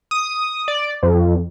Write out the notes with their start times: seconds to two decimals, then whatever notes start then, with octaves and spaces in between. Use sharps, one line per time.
0.11 D#6
0.68 D5
1.03 F2